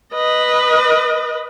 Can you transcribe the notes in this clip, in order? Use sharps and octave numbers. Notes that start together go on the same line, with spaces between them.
B4 D#5